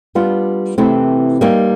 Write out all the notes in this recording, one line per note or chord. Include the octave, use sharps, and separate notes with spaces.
G3 B3 D4 F4
C3 E3 A3 C4 E4
G3 A#3 D#4